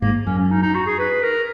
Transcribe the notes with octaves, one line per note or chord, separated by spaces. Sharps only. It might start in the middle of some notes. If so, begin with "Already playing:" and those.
G#1 G#2 A#3
F#2 C#4
C#4
D#4
D#4
F#4
G#4
B4
A#4